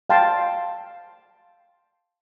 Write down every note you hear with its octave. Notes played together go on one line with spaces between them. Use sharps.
F5 G5 A5 C6